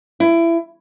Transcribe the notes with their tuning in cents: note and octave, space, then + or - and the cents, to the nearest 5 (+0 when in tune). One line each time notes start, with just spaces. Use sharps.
E4 +25